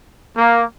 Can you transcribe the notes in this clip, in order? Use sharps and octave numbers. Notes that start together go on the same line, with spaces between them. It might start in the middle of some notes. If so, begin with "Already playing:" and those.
A#3